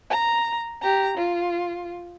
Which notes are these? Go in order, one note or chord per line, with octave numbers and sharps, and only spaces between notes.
A#5
G4 A#5
F4